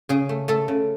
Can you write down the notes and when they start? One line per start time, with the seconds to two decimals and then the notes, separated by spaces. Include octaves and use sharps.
0.09 C#3 G#4
0.29 A3
0.48 A3 A4
0.68 C#3